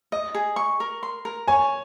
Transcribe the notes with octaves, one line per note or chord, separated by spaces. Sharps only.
D#5
G#4
C#6
A#4
C6
A#4
C#5 G#5